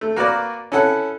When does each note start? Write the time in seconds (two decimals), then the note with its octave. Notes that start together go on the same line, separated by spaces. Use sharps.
0.01 A3
0.16 A#3 F#4 A#4 B4 D5
0.72 C#4 E4 A4 F#5